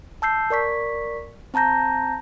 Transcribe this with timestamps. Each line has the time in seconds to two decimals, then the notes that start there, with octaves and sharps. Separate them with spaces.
0.22 A5 E6 G6 C7
0.50 A#4 D5 C#6 B6
1.54 C4 A5 A#5 G6 A#6